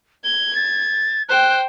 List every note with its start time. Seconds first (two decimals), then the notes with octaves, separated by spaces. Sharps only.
0.24 G#6 G7
0.55 A6
1.29 C5 G5 F#6